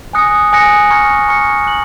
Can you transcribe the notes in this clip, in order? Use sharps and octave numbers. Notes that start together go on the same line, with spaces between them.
G#5 D#6 F#6 A#6 C#7
G#5 D#6 F#6 A#6 C#7
A#5 C#6 F6 G#6 C#7
A#5 C#6 F6 G#6 C#7
F#6 C#7 F#7